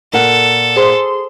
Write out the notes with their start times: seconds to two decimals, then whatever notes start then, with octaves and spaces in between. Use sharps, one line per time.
0.13 A#2 A4 A#4 F#5
0.76 G#4 C5 C6